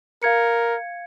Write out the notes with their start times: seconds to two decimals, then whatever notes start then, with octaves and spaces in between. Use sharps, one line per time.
0.23 A#4 F5 G#6 C#7